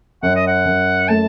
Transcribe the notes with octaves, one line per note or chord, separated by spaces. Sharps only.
F#2 F#5
D#5
F#5
F#2
A3 A5